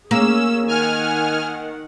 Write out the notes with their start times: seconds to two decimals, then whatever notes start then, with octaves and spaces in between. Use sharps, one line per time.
0.11 A#3 C#4 G#4 E6
0.68 D#3 F#5 G#5 F6